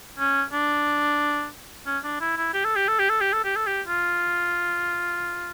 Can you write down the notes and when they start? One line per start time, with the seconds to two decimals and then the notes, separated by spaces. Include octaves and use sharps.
0.19 C#4
0.53 D4
1.86 C#4
2.04 D4
2.21 E4
2.37 E4
2.54 G4
2.65 A4
2.76 G4
2.88 A4
3.00 G4
3.10 A4
3.21 G4
3.33 A4
3.44 G4
3.56 A4
3.67 G4
3.87 F4